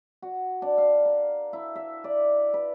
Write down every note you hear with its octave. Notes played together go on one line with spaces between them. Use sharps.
F#4
D4
F5
A#4
E4
E5
D5
B4